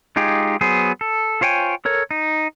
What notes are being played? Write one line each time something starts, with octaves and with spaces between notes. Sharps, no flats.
G#3 D#4 F4 G4 G#4
F#3 B3 G#4 C5
A4
F4 C5 C#5 G5 G#5
A4 A#4 C#5
D#4